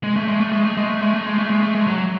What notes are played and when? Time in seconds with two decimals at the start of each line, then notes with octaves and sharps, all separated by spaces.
0.04 G#3
0.16 A3
0.28 G#3
0.40 A3
0.53 G#3
0.65 A3
0.77 G#3
0.90 A3
1.02 G#3
1.14 A3
1.26 G#3
1.39 A3
1.50 G#3
1.63 A3
1.75 G#3
1.87 F#3